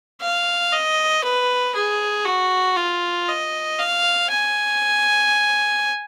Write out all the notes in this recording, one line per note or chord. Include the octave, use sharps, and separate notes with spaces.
F5
D#5
B4
G#4
F#4
F4
D#5
F5
G#5